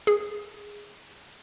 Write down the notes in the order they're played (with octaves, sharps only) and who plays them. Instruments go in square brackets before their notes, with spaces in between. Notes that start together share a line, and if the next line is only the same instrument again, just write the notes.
[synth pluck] G#4